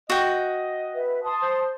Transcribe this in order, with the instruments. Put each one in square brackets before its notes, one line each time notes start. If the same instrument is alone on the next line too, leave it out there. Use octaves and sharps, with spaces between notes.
[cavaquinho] F#4 G5 [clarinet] D#5
[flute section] B4 E5
A5 C6 D#6
[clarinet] C5